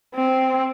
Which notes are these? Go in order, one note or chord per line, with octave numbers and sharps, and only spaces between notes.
C4